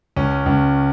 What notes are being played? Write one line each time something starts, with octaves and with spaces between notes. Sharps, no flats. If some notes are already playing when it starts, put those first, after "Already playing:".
C#2 C#4
C#2